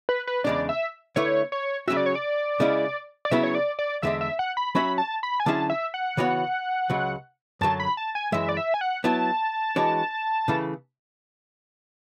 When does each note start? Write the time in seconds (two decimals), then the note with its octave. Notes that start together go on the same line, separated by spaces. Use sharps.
0.09 B4
0.27 B4
0.44 E2 C#3 G#3 D4 D5
0.69 E5
1.16 D3 A3 E4 B4 C#5
1.52 C#5
1.88 C#3 F#3 C#4 F#4 E5
1.97 D5
2.06 C#5
2.15 D5
2.60 C#3 G#3 C#4 E4
3.25 D5
3.31 C#3 F#3 B3 E4 E5
3.43 C#5
3.55 D5
3.79 D5
4.02 E2 D3 G#3 D4 E5
4.21 E5
4.39 F#5
4.57 B5
4.75 F#3 C#4 F#4 C#5 E5 B5
4.98 A5
5.23 B5
5.40 G#5
5.46 D3 F#3 C#4 E4 G#4 A5
5.70 E5
5.94 F#5
6.17 C#3 E3 B3 F#4 C#5
6.90 C#2 C#3 F#3
7.61 F#2 D3 F#3 A5
7.80 B5
7.97 A5
8.15 G#5
8.32 F#2 E3 G#3 E5
8.49 D5
8.57 E5
8.74 G#5
8.81 F#5
9.04 F#3 B3 E4 A5
9.76 E3 G#3 D4 F#4 C#5
10.48 C#3 E3 A3